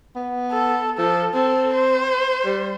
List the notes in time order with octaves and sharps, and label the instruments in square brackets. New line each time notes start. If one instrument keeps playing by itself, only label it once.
[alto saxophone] B3
[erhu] A4
[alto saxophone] F3 [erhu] A4
[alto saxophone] C4 [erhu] A4
[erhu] C5
[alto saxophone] G3